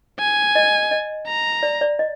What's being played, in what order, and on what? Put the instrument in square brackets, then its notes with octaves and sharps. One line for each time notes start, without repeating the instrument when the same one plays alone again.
[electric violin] G#5
[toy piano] D#5
D#5
[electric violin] A#5
[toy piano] D5
D5
D#5